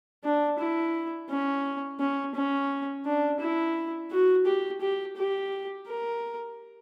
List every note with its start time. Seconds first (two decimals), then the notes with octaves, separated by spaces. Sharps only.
0.24 D4
0.59 E4
1.30 C#4
2.00 C#4
2.35 C#4
3.05 D4
3.40 E4
4.11 F#4
4.46 G4
4.81 G4
5.17 G4
5.87 A#4